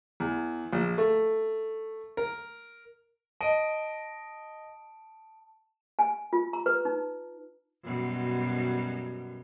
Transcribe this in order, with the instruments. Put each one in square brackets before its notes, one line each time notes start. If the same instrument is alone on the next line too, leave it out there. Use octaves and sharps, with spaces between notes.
[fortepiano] E2
A#1
A3
A#4
[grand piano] D#5 [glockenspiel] A5 D7
[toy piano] G#5
F4
A#5
B4
D#4
[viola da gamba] F#2 B2 G3